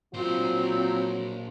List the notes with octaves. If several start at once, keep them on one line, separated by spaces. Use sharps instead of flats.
A#2 F#3 C4 F4 C5